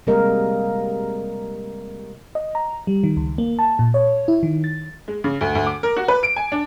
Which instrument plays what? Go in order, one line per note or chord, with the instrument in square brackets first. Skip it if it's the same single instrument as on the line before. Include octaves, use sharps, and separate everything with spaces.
[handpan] C3 G3 G#3 A#3 A#4 D#5
[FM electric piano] D#5
A#5
G3
D#3
C#2
A#3
A5
A#2
C#5
E4
D#3
A6
[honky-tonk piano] G#3
C#3
D2
D2
D6
A#4
F#4
B4
D7
G#5
D4